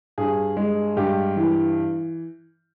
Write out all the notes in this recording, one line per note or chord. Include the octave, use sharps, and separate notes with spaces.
G2 G#4
G#3
G2 G4
E3